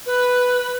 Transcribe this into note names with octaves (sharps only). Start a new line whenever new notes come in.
B4